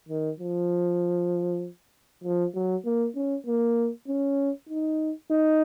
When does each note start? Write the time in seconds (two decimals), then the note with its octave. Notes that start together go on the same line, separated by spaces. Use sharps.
0.08 D#3
0.39 F3
2.23 F3
2.54 F#3
2.85 A#3
3.15 C#4
3.46 A#3
4.08 C#4
4.69 D#4
5.30 D#4